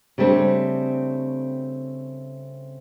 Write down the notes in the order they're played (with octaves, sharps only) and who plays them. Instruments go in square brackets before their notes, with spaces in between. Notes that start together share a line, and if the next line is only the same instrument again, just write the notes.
[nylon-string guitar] C#3 G3 A3 C4 D4